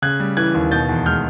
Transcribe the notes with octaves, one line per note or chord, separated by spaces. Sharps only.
C#3 F#6 G#6
G3
E3 F#6 G#6
D#2
B2 G6 A6
E2
G#3 F6 G6